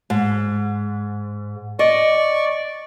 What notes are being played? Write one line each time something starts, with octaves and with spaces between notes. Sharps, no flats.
G#2
D5 D#5 C#6